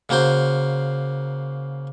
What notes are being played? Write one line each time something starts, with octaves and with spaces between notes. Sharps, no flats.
C#3 A#3 F#4 C5 C6